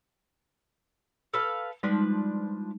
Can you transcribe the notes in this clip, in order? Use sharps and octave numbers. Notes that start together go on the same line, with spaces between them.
A4 B4 F5
F3 G3 G#3 D4 D#4 B4